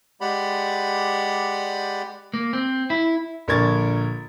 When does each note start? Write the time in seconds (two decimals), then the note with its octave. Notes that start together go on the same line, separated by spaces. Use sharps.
0.21 G#3 G4 D5 F#5 B5
2.34 A#3
2.53 C4
2.90 E4
3.48 A#1 D3 A#4 C#6 G#6 A6